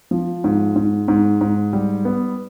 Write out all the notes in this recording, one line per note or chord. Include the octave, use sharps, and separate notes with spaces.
F3
G#2
G#2
G#2
G#2
G3
B3